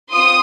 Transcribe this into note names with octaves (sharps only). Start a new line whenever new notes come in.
C4 F4 C6 D#6